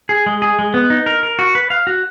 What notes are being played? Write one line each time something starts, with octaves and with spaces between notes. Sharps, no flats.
G#4
G#3
G#4
G#3
B3
D#4
A#4
A#4
F#4
B4
F5
F#4